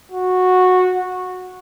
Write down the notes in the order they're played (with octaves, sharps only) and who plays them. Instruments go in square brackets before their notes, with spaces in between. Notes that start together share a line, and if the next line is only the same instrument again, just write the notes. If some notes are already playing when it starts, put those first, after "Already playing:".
[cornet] F#4